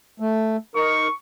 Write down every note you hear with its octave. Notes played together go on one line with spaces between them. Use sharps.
A3
D#4 A#4 C#6